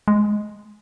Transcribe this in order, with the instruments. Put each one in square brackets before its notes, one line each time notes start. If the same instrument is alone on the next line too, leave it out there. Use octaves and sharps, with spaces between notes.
[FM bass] G#3